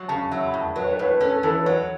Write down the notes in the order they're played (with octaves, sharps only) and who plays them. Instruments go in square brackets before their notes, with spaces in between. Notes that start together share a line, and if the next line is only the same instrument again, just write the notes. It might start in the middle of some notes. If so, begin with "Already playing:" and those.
Already playing: [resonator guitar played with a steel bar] F#3
[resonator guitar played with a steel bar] C#3 [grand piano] A5
[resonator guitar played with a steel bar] F#3 [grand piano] E5
[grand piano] B5
[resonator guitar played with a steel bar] A2
[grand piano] A5
[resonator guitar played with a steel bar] F#3 [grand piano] B4
[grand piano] C#5
B4
[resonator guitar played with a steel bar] A2 [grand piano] C#5
[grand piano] B4
[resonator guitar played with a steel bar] C#4 [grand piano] A4
[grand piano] A4
[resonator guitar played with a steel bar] E3 [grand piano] A4
[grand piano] B4
[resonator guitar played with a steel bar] F#3 [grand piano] C#5